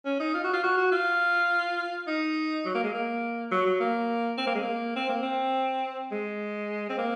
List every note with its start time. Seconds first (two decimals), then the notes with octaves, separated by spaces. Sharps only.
0.05 C#4
0.20 D#4
0.34 F4
0.44 F#4
0.53 F4
0.63 F#4
0.77 F#4
0.92 F4
2.07 D#4
2.65 F#3
2.75 A#3
2.84 G#3
2.94 A#3
3.51 F#3
3.66 F#3
3.80 A#3
4.38 C4
4.47 A#3
4.55 G#3
4.63 A#3
4.96 C4
5.09 A#3
5.23 C4
6.12 G#3
6.89 C4
6.98 A#3